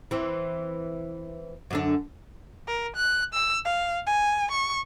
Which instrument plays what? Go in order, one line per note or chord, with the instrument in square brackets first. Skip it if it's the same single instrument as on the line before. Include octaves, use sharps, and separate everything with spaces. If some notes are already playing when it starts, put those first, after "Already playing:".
[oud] E3 C4
F#2 D3 D4
[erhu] A#4
F#6
E6
F5
G#5
C#6